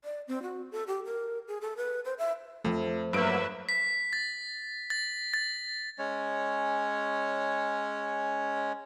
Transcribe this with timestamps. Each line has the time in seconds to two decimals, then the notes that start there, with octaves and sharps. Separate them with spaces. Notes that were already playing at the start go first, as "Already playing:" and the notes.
0.04 D5
0.28 C4
0.43 F#4
0.72 A4
0.87 G4
1.05 A#4
1.48 G#4
1.61 A4
1.77 B4
2.05 C5
2.18 E5
2.65 F2 F3 A3
3.13 G2 F#3 A#3 B4 E5 D7
3.69 B6
4.13 A6
4.90 A6
5.34 A6
5.99 G#3 C#4 C#5